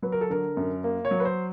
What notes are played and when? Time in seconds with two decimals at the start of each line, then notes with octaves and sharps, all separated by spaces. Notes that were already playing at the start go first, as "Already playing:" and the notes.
0.02 F#3 B4
0.12 A#4
0.21 A4
0.30 D3 A#4
0.57 F#2
0.84 A#3
1.05 C#5
1.11 F#3
1.20 B4
1.25 C5